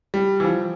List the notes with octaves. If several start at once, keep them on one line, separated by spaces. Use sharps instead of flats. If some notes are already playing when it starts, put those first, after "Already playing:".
G3
E3
F3